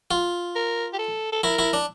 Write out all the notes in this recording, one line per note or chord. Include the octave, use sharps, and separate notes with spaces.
F4
A#4
G4
A4
A4
E4 A#4
E4
D4